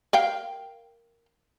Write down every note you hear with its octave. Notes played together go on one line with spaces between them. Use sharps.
A#4 F5 G5